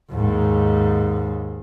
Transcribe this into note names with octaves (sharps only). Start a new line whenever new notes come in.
D#2 G#2